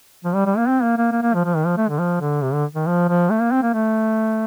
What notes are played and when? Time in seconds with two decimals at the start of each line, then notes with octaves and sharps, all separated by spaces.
0.24 F3
0.35 G3
0.46 G3
0.57 A#3
0.68 C4
0.83 A#3
0.98 A#3
1.12 A#3
1.22 A#3
1.34 F3
1.45 F3
1.56 D#3
1.66 F3
1.77 A3
1.89 D3
1.99 F3
2.21 D3
2.43 C3
2.53 D3
2.75 D#3
2.87 F3
3.09 F3
3.30 A3
3.41 A#3
3.52 C4
3.62 A#3
3.73 A3